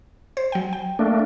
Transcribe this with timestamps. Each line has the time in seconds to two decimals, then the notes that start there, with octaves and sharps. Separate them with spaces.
0.37 C5
0.52 F#3 G5
0.73 G5
0.99 A3 A#3 D4